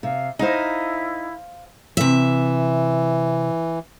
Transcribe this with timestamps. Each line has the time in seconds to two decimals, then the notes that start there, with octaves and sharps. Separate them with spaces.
0.03 C3 F5
0.39 D#4 E4 C5 F5 G#5
1.97 C3 E3 E5